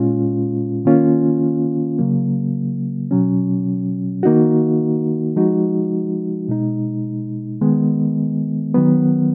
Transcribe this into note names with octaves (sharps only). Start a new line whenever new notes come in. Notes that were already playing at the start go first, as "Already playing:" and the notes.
Already playing: A#2 G#3 C#4 F4
D#3 A#3 C#4 F4
C#3 F#3 A#3
B2 F#3 C#4
D#3 A#3 D#4 F#4
F3 G#3 D#4 F#4
B2 G#3 D#4
D#3 G#3 B3
D#3 F#3 B3